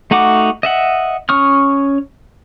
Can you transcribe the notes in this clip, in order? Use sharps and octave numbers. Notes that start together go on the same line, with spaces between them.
A3 D#4 F#4 F#5 D6
D#5 E5 F#5
C#4 C#6 D#6 F6